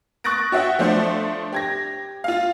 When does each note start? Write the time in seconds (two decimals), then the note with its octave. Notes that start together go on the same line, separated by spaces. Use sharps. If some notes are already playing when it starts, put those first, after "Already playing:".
0.24 C#6 D#6 F#6 A6 A#6 D7
0.52 F#4 C#5 E5 F#5 G5
0.79 F3 A3 D4 C5
1.52 G4 G#6 A#6
2.24 F4 F5